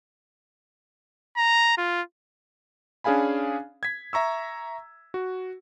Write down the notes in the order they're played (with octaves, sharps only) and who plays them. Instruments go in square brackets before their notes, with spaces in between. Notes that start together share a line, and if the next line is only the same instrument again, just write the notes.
[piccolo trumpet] A#5
F4
[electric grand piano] C#4 D4 G#4 F5 G#5 B5
G#6 B6
E5 A#5 C#6 E6
F#4